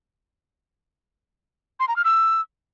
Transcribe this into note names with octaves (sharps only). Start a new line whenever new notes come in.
C6
A#5
F6
E6